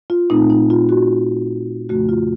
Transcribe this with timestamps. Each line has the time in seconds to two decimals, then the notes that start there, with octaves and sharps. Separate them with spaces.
0.10 F4
0.30 A#2 A3 C4 D#4
0.50 D#4
0.70 F4
0.89 F#4
1.89 F2 C#3 F3 A3 F#4
2.09 F4